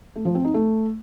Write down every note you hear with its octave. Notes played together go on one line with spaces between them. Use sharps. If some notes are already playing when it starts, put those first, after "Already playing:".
A3
F3
C4
D#4
A3